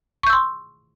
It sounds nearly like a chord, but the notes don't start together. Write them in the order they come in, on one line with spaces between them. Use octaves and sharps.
C#6 G6 E6 C6